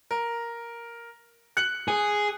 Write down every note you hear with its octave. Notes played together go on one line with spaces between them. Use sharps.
A#4
F#6 C#7 F#7
G#4